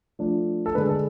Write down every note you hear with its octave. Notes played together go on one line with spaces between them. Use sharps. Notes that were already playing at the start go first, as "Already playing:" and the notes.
F3 A3 D4
A4
D3 G#3 D4 B4
A4